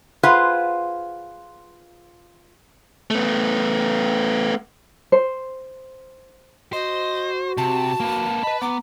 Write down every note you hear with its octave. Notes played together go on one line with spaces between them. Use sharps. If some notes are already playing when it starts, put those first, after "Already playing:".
F4 G#4 B4 C5 F5 F#5
A3 B3
C5
F#4 C5 D#5
C3 A5
A#3 B4
B4 D#5 B5
B3 A#5 D6